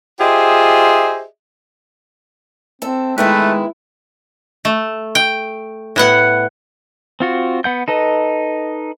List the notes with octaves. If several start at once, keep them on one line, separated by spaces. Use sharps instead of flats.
F4 G4 G#4 C5 D#5 E5
C4 A4 E5
D#3 G#3 A3 B3 E4 B4
A3
G5
A2 B3 F#5
C4 F4 F#4
B3 F#5 G6
D#4 A4 B4 D#5